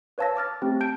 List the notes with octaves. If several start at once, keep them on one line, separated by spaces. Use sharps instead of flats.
B4 C#5 F5 A5 E6 A#6
A5 D6 F6 A6
A3 C4 G4
A5 G6 D7